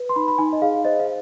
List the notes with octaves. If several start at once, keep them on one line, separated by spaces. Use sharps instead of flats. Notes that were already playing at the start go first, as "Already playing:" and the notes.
Already playing: B4
C6
D#4 B5
B5
D#4 G#5
D#5
G#4 F5
C5 D#5
F5